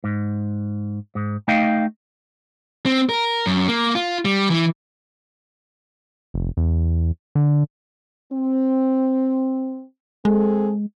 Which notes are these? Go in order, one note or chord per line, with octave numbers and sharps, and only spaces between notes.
G#2
G#2
A3 D#4 D#5 F5 G5
C4
A#4
F#2
A#3
F4
G3
E3
F1
E2
D3
C4
G#3 C4 G#4 A4